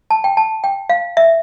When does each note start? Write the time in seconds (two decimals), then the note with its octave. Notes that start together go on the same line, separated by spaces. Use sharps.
0.10 A5
0.24 G5
0.37 A5
0.64 G5
0.90 F5
1.17 E5